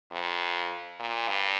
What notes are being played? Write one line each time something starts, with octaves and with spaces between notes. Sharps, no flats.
F2
A#2
G2